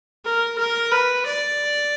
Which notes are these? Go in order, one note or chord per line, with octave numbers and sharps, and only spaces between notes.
A#4
A#4
B4
D5